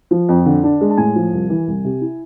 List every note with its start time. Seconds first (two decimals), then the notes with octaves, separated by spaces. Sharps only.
0.11 F3
0.29 F2
0.46 D3
0.63 D4
0.81 G#3
0.90 A5
0.98 A2 G#5
1.16 F3
1.33 C2
1.50 E3
1.67 C2
1.84 C3
2.01 E4